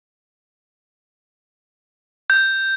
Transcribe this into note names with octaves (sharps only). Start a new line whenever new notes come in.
G6